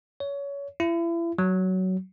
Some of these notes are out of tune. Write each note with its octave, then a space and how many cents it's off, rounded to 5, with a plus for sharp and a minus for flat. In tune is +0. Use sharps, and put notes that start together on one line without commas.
C#5 +25
E4 +35
F#3 +15